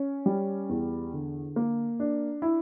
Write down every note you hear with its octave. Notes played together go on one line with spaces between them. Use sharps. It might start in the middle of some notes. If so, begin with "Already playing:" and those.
Already playing: C#4
G3
E2
D3
A#3
D4
E4